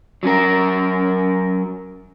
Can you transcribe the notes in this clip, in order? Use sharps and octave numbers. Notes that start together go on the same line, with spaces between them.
F#3 C#4 A#4